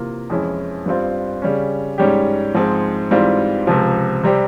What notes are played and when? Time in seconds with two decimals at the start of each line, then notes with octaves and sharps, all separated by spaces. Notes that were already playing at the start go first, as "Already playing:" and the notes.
Already playing: C3 E3 A#3 F4 A#4
0.30 F2 E3 G#3 C#4 E4
0.86 G2 G3 C4 F4
1.42 C#3 G3 C#4
1.98 G#2 G3 C#4 G4
2.54 G#2 F3 G#3 C4
3.10 G#2 E3 G3 C4 F4
3.67 C#2 C3 F3
4.23 C3 G3 C4 G4